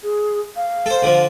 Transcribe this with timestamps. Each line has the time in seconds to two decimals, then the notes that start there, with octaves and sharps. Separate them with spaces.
0.03 G#4
0.56 F5
0.86 A4 C5
1.03 D3 F3